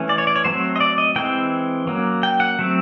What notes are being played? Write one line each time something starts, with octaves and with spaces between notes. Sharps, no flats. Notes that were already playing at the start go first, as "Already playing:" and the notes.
Already playing: E3 A3 C#4
D5
C#5
D5
C#5
F#3 A3 C4 C5
D#5
D5
D#5
E3 G#3 C4 G5
F#3 A#3 C#4
G5
F#5
F#3 A3 C4